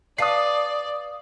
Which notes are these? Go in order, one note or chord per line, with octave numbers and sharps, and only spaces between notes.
B4 D5 F5 A5 D#6 C7